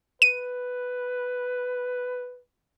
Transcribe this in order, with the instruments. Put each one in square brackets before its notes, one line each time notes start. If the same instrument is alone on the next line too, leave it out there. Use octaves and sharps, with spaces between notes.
[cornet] B4 [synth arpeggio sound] D#7